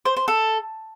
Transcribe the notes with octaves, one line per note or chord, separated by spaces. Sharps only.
C5
C5
A4